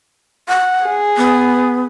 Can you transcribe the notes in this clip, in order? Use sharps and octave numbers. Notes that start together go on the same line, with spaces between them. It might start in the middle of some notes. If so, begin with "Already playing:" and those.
F#5
G#4
B3